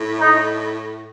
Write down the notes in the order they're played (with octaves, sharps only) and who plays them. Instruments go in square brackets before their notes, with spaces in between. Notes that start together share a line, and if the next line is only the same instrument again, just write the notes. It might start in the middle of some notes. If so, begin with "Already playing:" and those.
Already playing: [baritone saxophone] A2
[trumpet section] D#4